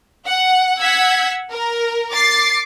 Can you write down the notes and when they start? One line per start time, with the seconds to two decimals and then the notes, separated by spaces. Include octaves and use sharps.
0.25 F#5
0.80 F#5 E6 G#6 B6
1.50 A#4
2.11 D6 A6 C7